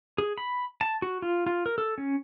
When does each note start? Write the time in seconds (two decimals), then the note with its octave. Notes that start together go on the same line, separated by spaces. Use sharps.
0.18 G#4
0.38 B5
0.81 A5
1.02 F#4
1.22 F4
1.47 F4
1.66 A#4
1.78 A4
1.98 C#4